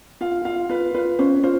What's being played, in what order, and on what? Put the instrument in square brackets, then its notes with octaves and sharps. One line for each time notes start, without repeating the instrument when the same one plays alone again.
[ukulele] F4 [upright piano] F5
[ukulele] F4 [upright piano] F5
[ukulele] F4 [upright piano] B4
[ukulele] F4 [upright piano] B4
[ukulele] C#4 [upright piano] C5
[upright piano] C#5
[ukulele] F4 [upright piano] C5